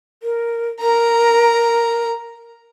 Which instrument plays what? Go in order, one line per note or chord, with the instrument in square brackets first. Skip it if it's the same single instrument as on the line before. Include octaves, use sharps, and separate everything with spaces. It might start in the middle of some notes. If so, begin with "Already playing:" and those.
[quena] A#4
[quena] A#4 [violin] A#5